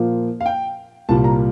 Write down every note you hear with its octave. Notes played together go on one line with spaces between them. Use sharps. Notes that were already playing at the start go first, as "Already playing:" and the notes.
Already playing: A#2 F3 A#3
F5
G5
C2 A#2 G3 A5
A#5